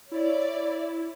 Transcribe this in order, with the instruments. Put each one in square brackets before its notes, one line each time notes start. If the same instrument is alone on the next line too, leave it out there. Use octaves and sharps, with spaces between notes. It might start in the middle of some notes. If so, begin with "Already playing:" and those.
[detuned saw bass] E4 [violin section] C#5 D5